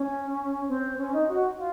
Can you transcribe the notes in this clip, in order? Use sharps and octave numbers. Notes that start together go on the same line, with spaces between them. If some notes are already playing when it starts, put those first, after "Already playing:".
Already playing: C#4
C4
C#4
D#4
F#4
F4